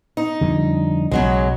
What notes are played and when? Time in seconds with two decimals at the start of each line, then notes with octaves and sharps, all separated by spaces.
0.17 D#4
0.41 F2 D3 G3
1.11 B1 C#3 F#3 G#3